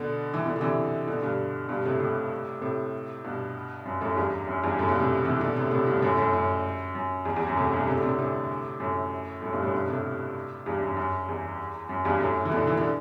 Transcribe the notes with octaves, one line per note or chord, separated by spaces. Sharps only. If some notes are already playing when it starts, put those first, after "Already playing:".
Already playing: B2 D3
E3
B2 D3
D3
C3 E3
B2 D3
G2 B2
G2 B2
A2 C3
A2 C3
A2 C3
G2 B2
F#2
F#2 A2
E2 G2
F#2
E2 G2
F#2 A2
G2 B2
A2 C3
C3 E3
B2 D3
A2 C3
A2 C3
G2 B2
F#2 A2
F#2 A2
F#2
F#2
E2
E2
F#2
A2 C3
G2 B2
A2 C3
D3
A2 C3
A2 C3
F#2 A2
F#2 A2
G2 B2
F#2 A2
G2 B2
A2 C3
E2 G2
F#2
F#2
E2
F#2
E2 G2
F#2 A2
E3
B2 D3
E3
D3